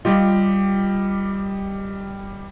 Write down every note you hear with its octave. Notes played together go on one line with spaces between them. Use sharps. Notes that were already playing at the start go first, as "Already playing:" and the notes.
G3 F4 G4 D#5